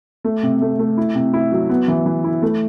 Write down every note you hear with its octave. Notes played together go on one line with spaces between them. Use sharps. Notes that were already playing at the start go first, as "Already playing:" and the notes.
A3
C3
A3
A3
E4
C3
E4
F#3
B3
E3
E3
E4
A3